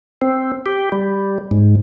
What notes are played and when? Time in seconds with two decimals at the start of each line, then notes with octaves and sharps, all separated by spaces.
0.22 C4
0.66 G4
0.92 G3
1.51 G#2